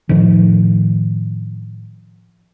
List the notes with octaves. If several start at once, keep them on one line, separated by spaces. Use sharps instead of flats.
A2 D#3 F3